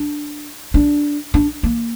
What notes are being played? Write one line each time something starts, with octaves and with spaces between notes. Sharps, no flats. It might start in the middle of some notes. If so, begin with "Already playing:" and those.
Already playing: D4
D4
D4
A#3